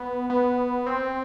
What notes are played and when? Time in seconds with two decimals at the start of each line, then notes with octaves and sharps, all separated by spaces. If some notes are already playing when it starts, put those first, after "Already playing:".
Already playing: B3
0.30 B3
0.86 C4